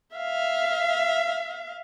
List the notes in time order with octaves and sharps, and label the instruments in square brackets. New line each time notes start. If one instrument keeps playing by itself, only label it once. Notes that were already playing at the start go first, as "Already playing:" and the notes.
[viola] E5 F5